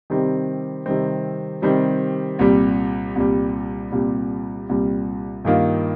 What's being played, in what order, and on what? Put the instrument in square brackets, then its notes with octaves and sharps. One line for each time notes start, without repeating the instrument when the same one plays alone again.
[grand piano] C3 D#3 G3 C4
C3 D#3 G3 C4
C3 D#3 G3 C4
C2 A#2 G3
C2 A#2 G3
C2 A#2 G3
C2 A#2 G3
G2 D#3 A#3 F4